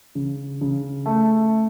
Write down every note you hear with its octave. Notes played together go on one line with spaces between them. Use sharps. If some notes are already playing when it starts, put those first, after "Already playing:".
C#3
C#3
A3